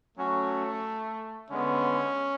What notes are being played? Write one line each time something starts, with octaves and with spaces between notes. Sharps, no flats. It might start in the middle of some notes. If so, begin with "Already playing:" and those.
F#3 A3 C#4 F#4
D3 G#3 B3 C#4